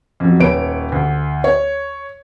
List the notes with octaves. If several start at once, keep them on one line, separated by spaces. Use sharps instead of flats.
F2 F#3
D#1 B4 C#5 D7
D2
C#5